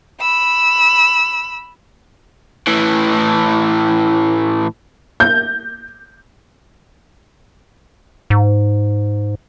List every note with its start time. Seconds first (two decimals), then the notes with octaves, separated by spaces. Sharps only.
0.20 B5 E6
2.67 A2 E3
5.20 G6
8.30 G#2